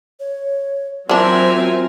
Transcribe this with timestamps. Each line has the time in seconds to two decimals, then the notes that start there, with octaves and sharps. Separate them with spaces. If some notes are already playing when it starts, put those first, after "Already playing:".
0.20 C#5
1.09 E3 F#3 C4 D4 F4 A#4 E5 G#5